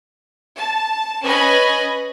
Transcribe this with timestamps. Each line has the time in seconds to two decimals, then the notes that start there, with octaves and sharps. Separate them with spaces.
0.57 A5
1.23 C#4 B4 D#5 G#5 B5